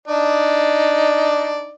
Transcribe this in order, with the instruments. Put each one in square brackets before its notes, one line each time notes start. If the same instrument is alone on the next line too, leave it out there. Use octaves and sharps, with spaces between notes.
[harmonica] D4 D#4 D5